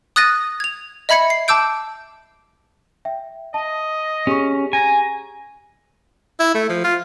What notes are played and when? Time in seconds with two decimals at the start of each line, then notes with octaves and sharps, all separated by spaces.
0.16 D#6 F#6 A6 A#6 D#7
0.60 G#6 F7
1.09 D#5 E5 B5 G#6 C#7
1.30 C7
1.48 A5 D6 E6 G6 D7
3.05 E5 G5
3.54 D#5 A5
4.27 C#4 G4 G#4 C#6
4.73 G#5 A#5
6.40 E4
6.55 A3
6.70 F3
6.84 F4